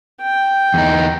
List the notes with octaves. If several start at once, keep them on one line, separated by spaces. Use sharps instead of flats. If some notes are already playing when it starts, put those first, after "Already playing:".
G5
E2 D#4